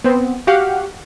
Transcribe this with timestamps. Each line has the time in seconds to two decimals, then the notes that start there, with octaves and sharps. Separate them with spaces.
0.04 B3 C4
0.47 F#4 G4 F5 F#5